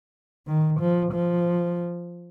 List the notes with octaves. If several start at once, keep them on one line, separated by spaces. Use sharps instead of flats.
D#3
F3
F3